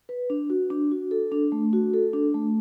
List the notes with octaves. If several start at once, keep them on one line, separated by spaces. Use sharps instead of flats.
B4
D4
F#4
D4
F#4
A4
D4
A3
F#4
A4
D4
A3